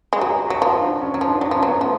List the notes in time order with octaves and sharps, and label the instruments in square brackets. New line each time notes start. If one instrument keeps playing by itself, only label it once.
[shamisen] G#3
[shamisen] F#3 [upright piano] F#4
[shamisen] F#3 [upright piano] F#4
[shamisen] F3 [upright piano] F4
[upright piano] D4
C#4
[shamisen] F#3 [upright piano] C#4
[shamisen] F3
[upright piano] D4
[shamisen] F#3 [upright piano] D4
[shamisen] F3 [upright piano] C#4
[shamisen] F#3 [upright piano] B3
[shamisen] F3 [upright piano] A3